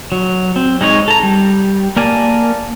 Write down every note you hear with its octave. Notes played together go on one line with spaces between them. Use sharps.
F#3
C4
G#3 D#4 G#4 C#5
A4 A#5
G3
A#3 A#4 D5 G#5 A5